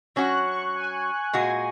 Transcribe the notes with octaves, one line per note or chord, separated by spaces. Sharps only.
F#3 C#4 F#4 F#6
C#6
G#5
A#2 G#3 F#4 G#5